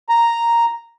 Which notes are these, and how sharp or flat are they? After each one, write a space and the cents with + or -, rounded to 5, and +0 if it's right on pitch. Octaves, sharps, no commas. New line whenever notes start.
A#5 +0